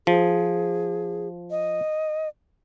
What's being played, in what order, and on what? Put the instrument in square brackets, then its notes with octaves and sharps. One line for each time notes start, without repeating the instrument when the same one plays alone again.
[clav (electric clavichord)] F3 [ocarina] G#4
[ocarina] D#5